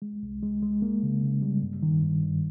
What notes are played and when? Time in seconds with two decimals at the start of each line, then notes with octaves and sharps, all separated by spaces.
0.02 G#3
0.23 C2
0.43 G#3
0.62 G#3
0.82 A#3
1.03 C#3
1.23 C#3
1.42 G3
1.62 G2
1.83 D#3
2.03 G2
2.23 G2